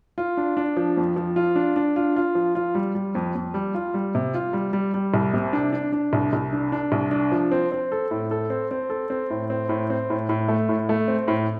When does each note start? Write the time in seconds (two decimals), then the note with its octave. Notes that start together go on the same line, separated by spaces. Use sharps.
0.18 F4
0.37 D4
0.57 D4
0.77 F3
0.97 F2
1.16 F3
1.36 F4
1.56 D4
1.76 D4
1.96 F4
2.16 F4
2.35 F3
2.55 F4
2.75 G3
2.95 G3
3.15 F2
3.35 F2
3.54 G3
3.75 F4
3.94 G3
4.15 C3
4.34 F4
4.53 G3
4.73 G3
4.94 G3
5.14 C2
5.34 C3
5.53 D4
5.73 D4
5.92 D4
6.13 C2
6.33 C2
6.53 D4
6.72 D4
6.92 C2
7.11 D4
7.32 F3
7.51 C4
7.72 C4
7.92 A4
8.11 A2
8.31 A4
8.50 C4
8.71 C4
8.90 A4
9.10 C4
9.30 A2
9.50 C4
9.69 A2
9.90 C4
10.10 A2
10.29 A2
10.48 A3
10.69 A2
10.89 A3
11.08 C4
11.28 A2